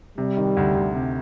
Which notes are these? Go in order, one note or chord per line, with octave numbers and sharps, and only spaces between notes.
C3 G3
D#3
D2
D2
C3